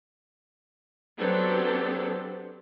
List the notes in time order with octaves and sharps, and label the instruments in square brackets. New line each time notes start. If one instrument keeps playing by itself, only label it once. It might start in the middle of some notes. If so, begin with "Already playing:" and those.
[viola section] F#3 B3 C4 D4 G4 A4